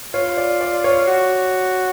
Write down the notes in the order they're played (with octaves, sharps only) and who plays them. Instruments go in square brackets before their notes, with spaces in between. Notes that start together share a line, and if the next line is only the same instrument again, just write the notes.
[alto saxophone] F4 [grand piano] C#5
[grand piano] D5
D5
C#5
[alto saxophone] F#4